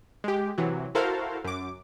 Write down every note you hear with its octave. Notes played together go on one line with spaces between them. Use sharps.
G#3 G4
C3 E3 F#3
E4 F#4 A4 A#4 C5 F5
F#2 D6